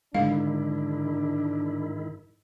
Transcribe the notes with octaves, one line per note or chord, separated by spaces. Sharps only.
G#2 D3 D#3 G#3 D4 E4 F5